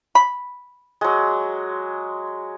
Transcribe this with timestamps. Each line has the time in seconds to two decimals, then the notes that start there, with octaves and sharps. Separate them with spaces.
0.15 B5
1.01 F#3 G#3